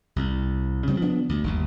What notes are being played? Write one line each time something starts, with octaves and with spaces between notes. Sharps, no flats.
C2
C#3 G3 B3 C4
F3 B3 D4
D2
G1 D#2